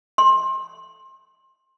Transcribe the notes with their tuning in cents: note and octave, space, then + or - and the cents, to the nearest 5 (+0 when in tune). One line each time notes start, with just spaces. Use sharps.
C6 +25